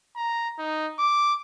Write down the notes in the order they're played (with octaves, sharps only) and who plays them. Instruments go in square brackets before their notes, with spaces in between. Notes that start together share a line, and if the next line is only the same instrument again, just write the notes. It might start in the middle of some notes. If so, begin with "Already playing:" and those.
[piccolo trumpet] A#5
D#4
D6